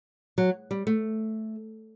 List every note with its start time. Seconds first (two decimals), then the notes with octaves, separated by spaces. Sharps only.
0.38 F#3
0.71 G3
0.87 A3